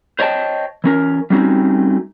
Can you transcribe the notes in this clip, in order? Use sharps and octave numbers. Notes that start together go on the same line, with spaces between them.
C5 C#5 D#5 G5 A5
E3 C#4 A#4
G3 A3 C4 C#4 D#4 F#4